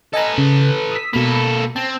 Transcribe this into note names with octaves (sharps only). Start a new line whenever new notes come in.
A4 B4 D#5 G#5 A#5
C#3
D#6 E6 B6
B2 A#3 A4 B5
C4 A5